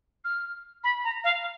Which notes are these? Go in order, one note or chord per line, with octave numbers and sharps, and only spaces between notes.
F6
B5
A#5
F5